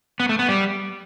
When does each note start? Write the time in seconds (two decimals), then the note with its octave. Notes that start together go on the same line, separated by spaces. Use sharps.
0.20 B3
0.29 A3
0.39 B3
0.49 G3